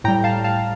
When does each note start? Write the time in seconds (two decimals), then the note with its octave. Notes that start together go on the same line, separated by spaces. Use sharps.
0.04 A2 G3 G5 A#5
0.24 F5 A5
0.44 F5 A5